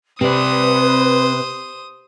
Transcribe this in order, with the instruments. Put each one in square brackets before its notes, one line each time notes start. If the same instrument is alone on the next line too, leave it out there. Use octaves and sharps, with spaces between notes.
[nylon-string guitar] C3 [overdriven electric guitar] C4 D5 [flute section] B4 [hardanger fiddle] C5 D#6